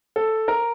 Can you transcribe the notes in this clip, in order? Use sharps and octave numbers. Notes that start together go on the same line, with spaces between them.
A4
A#4